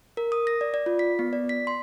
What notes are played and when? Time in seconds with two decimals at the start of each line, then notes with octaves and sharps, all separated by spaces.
0.17 A#4
0.32 D#6
0.47 A#6
0.61 D5
0.74 D5
0.86 F4
0.99 B6
1.19 B3
1.33 D5
1.49 B6
1.67 C6